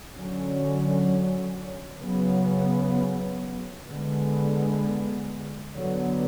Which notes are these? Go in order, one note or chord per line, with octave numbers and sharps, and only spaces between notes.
D3 F#3 C#4
C#3 F#3 B3
D3 G#3 B3
D3 F#3 B3